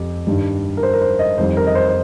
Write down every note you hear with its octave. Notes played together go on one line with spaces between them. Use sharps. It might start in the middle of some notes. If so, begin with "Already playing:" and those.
Already playing: F2 G4
G2 D#3 G3
A#4
C5
A#4
C5
D#5
F2 D#3 G3 C5
A#4
D#5
C5
C5